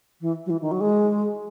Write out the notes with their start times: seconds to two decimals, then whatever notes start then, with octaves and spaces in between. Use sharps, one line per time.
0.20 E3
0.45 F#3
0.50 E3
0.61 D#3
0.71 F#3
0.80 G#3